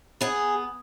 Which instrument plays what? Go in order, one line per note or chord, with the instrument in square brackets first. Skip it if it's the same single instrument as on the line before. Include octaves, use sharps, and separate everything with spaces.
[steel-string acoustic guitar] B3 G#4